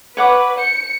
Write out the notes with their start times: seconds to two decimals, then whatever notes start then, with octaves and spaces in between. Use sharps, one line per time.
0.17 B4 C#5 F#5 D6
0.57 C5 C#7